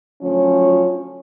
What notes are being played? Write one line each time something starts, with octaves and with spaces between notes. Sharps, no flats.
D2 F3 F#3 C#4